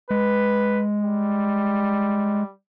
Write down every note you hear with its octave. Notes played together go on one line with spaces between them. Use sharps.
G#3 B4
G3